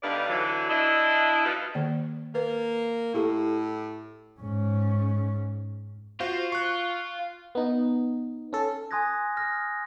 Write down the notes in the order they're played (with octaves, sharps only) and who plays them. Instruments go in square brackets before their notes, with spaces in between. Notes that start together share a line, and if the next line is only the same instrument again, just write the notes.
[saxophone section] G2 D3 B3 D#4 D5 F5
D3 E3 F#3
D4 E4 D#5
F3 G3 D#4 F4 F#4 B4
[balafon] D#3 A#3 D5
[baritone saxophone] A#3 [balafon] B4
[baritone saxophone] A2 [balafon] E4 G4 A4
[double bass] G#2 C#4
[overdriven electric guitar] F4 [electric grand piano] F#4 C5
[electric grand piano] C#6 F#6
[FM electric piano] B3 D#4
C#4 A4
[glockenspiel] G#5 C6 D#6 F#6 G#6 A#6
D#6 F6 A#6